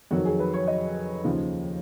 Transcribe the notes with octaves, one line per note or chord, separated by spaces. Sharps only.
F2 D#3 F#3 F#4
G#4
B4
C#5
D#5
D#2 C#3 F3